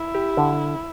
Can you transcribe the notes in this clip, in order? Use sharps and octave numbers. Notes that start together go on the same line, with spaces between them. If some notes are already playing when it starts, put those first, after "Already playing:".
Already playing: E4
G4
D3